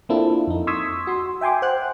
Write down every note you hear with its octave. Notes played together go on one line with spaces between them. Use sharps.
A#3 C4 D4 E4 F4 A4
F2 D#4
C6 C#6 D#6 E6 G#6 B6
F#4 C6
E5 G5 G#5 C6 D6
C5 F#5 G5 F#6